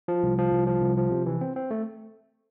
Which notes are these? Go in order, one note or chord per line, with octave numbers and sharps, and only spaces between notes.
F3
C2
F3
C2
F3
C2
F3
C3
E3
C4
C4
A3